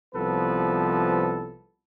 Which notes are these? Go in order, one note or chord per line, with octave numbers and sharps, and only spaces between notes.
C2 F3 B3 A4 B4